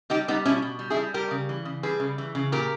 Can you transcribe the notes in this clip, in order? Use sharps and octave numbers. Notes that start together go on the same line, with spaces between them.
G3 D#4 G4
G3 B3 D#4
B2 C#4 E4
B2
G3
E4 G#4
G3
G3 G4 A#4
C#3
E3
C#3
G3 G#4 B4
C#3
E3
C#3
A#2 G4 A#4